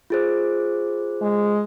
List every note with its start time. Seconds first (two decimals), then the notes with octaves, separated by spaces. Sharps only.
0.10 F4 G#4 C5
1.21 G#3